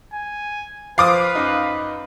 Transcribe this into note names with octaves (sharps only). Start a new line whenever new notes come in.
G#5
F3 B4 F5 C6 D6 D#6 D7
F#2 D#4